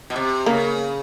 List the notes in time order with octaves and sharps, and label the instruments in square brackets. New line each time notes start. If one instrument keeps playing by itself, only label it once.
[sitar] B2
C3
[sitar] C#3 [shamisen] A#3